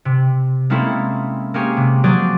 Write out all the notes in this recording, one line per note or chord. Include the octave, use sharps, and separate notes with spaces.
C3
G#3 A#3 C4 C#4 E4 A4
A#3 C4 C#4 G4 G#4
C3
F3 F#3 G#4 C5 D5